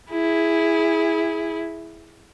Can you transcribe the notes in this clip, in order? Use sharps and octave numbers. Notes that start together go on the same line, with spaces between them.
E4 G#4